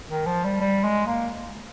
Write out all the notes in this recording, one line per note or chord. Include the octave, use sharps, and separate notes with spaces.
D#3
F3
G3
G3
G#3
A#3